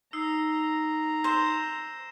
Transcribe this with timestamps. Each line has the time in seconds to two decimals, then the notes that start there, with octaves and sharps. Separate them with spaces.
0.13 D#4 A#5 E6 C7
1.24 C5 E6 C7 E7